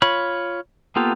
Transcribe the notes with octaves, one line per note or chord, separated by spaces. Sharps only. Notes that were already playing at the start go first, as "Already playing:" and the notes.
F4 C#5 B5
A#3 B3 F4 G4 A4